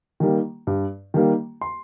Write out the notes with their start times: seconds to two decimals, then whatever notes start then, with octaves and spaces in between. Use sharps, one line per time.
0.20 D#3 G3 A#3
0.67 G2
1.14 D#3 G3 A#3
1.61 C6